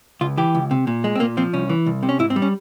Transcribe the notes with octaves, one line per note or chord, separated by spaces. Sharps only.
C#2 F4
E3 G4
C#2
C3
A#2
G#3
C4
A#2 A#3
F3 C4
C2 C#4
E3
C2
C3
C#4
G#2 E4
C4
G3
C#4